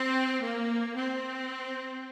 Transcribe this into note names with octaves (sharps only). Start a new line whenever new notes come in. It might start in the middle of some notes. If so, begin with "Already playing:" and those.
Already playing: C4
A#3
C4